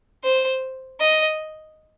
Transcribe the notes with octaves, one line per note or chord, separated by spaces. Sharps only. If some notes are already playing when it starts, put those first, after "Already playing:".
C5
D#5